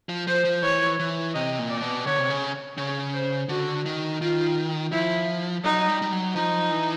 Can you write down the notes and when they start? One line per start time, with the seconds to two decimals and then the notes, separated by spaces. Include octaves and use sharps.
0.09 F3
0.27 F3 C5
0.45 F3
0.62 E3 C#5
0.99 E3
1.34 C3 D#5
1.59 A#2
1.70 D5
1.82 B2
2.06 D3 C#5
2.18 C3
2.30 C#3
2.78 C#3 C#5
3.13 C5
3.49 D3 F#4
3.86 D#3
4.21 D#3 F4
4.92 F3 E4
5.64 F#3 D#4
5.88 G3
6.02 G3
6.12 F#3
6.36 F3 D#4
6.71 E3